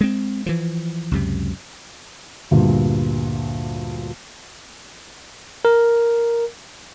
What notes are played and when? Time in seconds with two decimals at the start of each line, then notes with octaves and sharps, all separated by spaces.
0.01 G#3 C4
0.46 E3 F3
1.11 C#2 F#2 C3
2.51 D2 G2 A#2
5.65 A#4